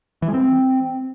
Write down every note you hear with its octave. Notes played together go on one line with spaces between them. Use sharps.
E3
G#3
C4